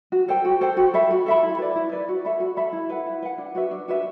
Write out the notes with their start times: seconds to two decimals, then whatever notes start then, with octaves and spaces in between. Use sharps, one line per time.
0.12 F#4
0.28 A4 C5 G5
0.45 F#4
0.61 A4 C5 G5
0.77 F#4
0.94 A4 E5 B5
1.11 F#4
1.26 A4 E5 B5
1.43 E4
1.59 B4 D5
1.76 E4
1.92 B4 D5
2.08 F#4
2.25 A4 E5 B5
2.40 F#4
2.57 A4 E5 B5
2.73 E4
2.89 B4 F#5
3.06 E4
3.22 B4 F#5
3.38 D4
3.55 F#4 B4 E5
3.71 D4
3.88 F#4 B4 E5